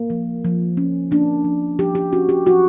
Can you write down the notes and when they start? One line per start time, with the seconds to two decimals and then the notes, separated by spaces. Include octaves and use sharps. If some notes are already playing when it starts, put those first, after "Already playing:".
Already playing: A#3
0.10 F3
0.45 F3
0.77 C#4
1.11 A#3 D4
1.45 F3
1.79 F3 G4
1.95 G4
2.13 C#4 F#4
2.29 G4
2.46 F3 F#4